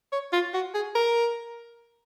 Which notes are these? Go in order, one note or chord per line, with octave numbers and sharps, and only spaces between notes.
C#5
F4
F#4
G#4
A#4